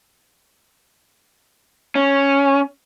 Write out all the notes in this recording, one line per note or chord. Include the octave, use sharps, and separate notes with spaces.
C#4